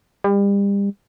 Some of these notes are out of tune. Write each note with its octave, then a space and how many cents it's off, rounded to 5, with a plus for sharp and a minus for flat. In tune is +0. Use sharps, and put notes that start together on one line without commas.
G3 +35